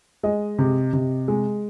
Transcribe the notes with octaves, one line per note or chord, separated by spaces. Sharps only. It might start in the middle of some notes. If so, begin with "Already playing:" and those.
G#3 D#5
C3
C3
G#3